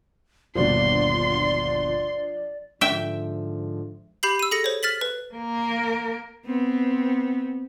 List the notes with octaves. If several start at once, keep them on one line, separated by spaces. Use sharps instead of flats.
G1 D#2 B2 F3 D4 D5 C6
G#2 D3 F3 E5 G5
G4 B5 G6 C7 F#7
E6 D#7
G#4 A4 A#6 C#7
C5 C#5
F6 A6 B6 F#7
B4
A#3 A#4
B3 C4